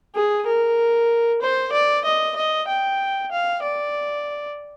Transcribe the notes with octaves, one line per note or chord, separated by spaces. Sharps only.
G#4
A#4
C5
D5
D#5
D#5
G5
F5
D5